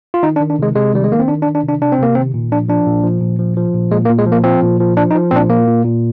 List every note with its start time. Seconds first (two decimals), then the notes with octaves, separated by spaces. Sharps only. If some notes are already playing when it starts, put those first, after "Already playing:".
0.14 F4
0.23 D#3 D#4
0.36 D4
0.40 D#3
0.50 D4
0.59 C3 G#3
0.75 C3 G#3
0.94 D#3 G3
1.04 G#3
1.11 D#3 A#3
1.19 C4
1.28 D#3 D4
1.42 D4
1.47 D#3
1.55 D4
1.63 C3
1.69 D4
1.81 C3 D4
1.92 C4
1.99 C3 A#3
2.15 D#3 C4
2.34 A#2
2.52 F3 D4
2.68 F3 D4
2.87 A#2
3.03 F3
3.21 A#2
3.39 F3
3.57 F3
3.74 A#2
3.91 A#2 G#3
4.05 A#3
4.09 A#2
4.18 G#3
4.26 F3
4.32 A#3
4.44 F3 C4
4.62 A#2
4.80 F3
4.97 F3 D4
5.11 D#4
5.15 F3
5.31 A#2 C4 D4
5.49 A#2 A#3
5.67 A#2
5.84 A#2